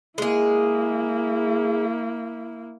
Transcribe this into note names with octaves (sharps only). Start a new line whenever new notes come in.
G#3 A#3 E4 G#4